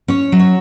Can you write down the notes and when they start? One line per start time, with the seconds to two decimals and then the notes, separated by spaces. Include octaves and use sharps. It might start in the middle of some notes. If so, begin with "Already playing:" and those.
0.08 C#4 C#5
0.32 F#3
0.39 C#5